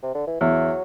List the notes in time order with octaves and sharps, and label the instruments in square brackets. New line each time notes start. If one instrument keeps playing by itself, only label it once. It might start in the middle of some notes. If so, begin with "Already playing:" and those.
[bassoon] C3
D3
E3
[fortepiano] E2 [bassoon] F#3